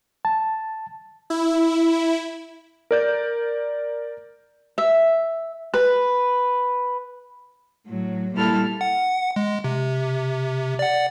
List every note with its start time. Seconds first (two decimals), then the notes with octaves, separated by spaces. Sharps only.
0.25 A5
1.30 E4
2.91 A#4 D5 G6
4.78 E5
5.74 B4
7.86 A2 F#3
8.34 A#2 G3 E4 A4 F6
8.81 F#5
9.36 G#3
9.64 C3
10.79 D5 F#5